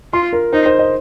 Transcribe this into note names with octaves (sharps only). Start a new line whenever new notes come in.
F4 C6
A#4
D#4 C5
C5
D#5